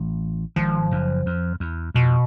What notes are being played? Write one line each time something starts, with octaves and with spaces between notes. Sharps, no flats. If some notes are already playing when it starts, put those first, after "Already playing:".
Already playing: A1 A2
G#1 G#2 F3
F#1 F#2
F2
E2
F2 B2